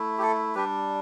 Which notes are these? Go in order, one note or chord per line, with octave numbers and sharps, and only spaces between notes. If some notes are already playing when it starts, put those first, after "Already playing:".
Already playing: A3 E4
G4
A4
G3 D4 G4 B4